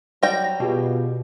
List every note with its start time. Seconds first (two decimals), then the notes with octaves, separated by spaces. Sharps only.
0.23 F#3 G3 G5 A#6
0.60 B2 B3 F4 G4 G#4